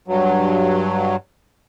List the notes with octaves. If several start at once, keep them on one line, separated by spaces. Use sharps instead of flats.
G2 F#3